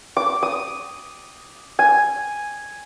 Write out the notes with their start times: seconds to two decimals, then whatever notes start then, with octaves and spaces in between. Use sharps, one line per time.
0.17 D6
0.43 D#6
1.79 G#5